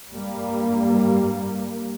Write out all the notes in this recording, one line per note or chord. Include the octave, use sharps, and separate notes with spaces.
G2 G3 A#3